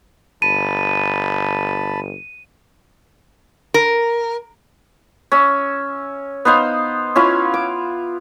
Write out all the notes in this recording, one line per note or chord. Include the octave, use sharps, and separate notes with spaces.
G1 A5 B5 D#7
A#4
C#4 E5
B3 D#4 C5 F5
C#4 E4 F4 F5
D6